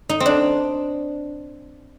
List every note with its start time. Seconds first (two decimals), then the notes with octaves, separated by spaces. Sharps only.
0.09 D#4
0.20 C4
0.26 D4